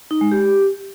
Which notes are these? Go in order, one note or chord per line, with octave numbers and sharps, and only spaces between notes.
D#4
G#3
G4